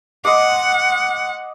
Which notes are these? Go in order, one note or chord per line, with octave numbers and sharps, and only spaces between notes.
D#5 F#5 C6 D6